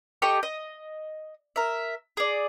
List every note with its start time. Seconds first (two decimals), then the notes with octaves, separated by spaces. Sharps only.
0.22 G4 A4 D#5 C#6
0.43 D#5
1.56 A#4 E5
2.17 G#4 D5